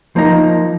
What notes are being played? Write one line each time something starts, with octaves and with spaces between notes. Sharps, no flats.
F3 A#3 D#4